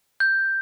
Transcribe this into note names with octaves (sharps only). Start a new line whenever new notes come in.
G6